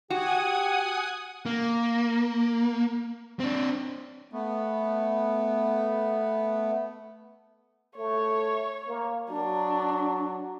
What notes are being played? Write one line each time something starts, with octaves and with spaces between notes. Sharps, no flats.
F#4 G4 F#5 G#5 D#6
A#3
C4 D4
A3 B3
A3 C#5
A#3
F#3 D4